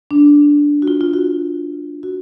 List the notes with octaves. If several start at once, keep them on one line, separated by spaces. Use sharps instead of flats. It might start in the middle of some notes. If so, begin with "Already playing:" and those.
D4
F#4
F4
F4
F#4
F#4